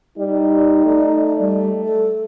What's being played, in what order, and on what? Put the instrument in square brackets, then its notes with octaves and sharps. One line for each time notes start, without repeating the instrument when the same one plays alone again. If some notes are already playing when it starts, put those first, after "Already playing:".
[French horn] G3 [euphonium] D#4
[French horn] A3 [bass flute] D5
[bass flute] G3
A4